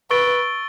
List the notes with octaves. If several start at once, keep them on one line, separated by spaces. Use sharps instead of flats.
B4 C#6 E6 A6 D7 G7